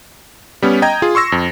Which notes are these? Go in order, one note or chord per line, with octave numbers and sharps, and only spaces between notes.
G3 B3 C#4
D#5 G5 A#5 G#6
F4 G#4
C6 C#6 E6 A#6
F2